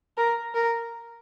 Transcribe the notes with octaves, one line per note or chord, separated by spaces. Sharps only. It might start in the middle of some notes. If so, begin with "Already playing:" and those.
A#4
A#4